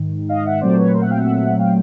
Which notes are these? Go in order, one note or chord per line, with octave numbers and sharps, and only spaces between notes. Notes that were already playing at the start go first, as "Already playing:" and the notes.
Already playing: G#2 D#3
D#5 F5
E5 F#5
A#2 F#3 A3 C4 C5 D5
B4 C#5
A#4 C5
E5 F#5
F5 G5
E5 F#5
F5 G5